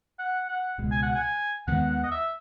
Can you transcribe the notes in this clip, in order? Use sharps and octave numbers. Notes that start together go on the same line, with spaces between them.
F#5
F#5
C#2 B2 G#3
G#5
F#5
G#5
D#2 D#3 G#3 B3 F#5
F#5
D#5
E5